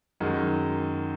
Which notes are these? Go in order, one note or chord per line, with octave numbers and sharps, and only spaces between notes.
F#2 D#3 G#3